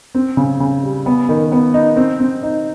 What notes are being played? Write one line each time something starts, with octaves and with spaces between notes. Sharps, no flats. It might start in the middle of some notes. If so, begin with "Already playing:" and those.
C4
C#3
C#3
G3
B3
D#3
B3
D#4
C4
C4
D#4